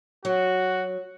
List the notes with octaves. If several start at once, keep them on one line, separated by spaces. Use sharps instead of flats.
F#3 F#4